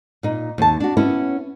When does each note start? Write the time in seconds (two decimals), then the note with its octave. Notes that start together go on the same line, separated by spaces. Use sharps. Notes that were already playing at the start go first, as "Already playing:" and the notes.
0.23 A#2 D#4
0.58 D#2 A5
0.80 D4 F#4
0.97 B3 C#4 E4